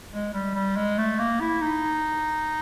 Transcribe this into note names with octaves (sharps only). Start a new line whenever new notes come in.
G#3
G3
G3
G#3
A3
A#3
E4
D#4